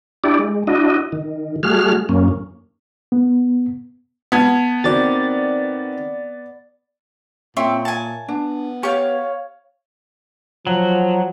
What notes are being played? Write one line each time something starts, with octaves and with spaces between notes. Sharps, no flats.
D4 E4 G4 D5
G#3
D4 E4 F#4 D#5
D#3
G3 A3 F#4 G#4 F6
F#2 A#3 C#4
B3
B3 A5 G#6
D#3 C4 F#4 D5 A6
A#2 C4 C#5 E5
G#5 A5
B3 D4
G4 C#5 F5 C#6
F3 F#3